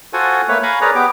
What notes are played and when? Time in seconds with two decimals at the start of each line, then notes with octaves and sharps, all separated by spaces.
0.13 F4 F#4 A4 C5 F#5 G#5
0.49 A3 A#3 B4 C#5
0.63 F5 G#5 A#5 B5 C#6
0.81 G#4 A#4 B4 C#5 D5 A#5
0.95 B3 G4 D6